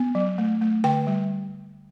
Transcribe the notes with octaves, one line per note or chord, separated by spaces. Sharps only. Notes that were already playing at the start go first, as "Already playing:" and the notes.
Already playing: B3
F#3
A3
A3
D3 G5
G3